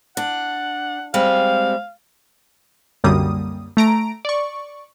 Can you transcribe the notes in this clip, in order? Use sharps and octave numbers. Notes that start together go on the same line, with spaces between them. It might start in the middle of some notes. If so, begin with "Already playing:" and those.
D4 F#5
G3 G#3 C4 F5
C2 F#2 D3 G3 A#3 D#6
A3 A#5 D7
D5 C#6